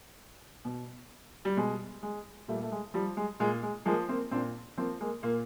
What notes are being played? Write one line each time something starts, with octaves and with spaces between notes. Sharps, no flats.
B2
G3
B2 G#3
G#3
A#2 G3 A3
A3
G#3
F3 G3
G#3
A#2 G#3
G#3
F3 G#3 A#3
A#3 C4
A#2 C4 D4
F3 A#3 C4
G#3 A#3
A#2 A#3